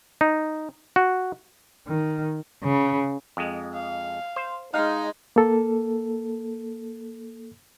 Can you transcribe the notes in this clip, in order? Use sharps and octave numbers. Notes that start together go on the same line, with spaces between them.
D#4
F#4
D#3
C#3
F2 G#3
F5
C5
G#3 D#4 F5
A#3 A4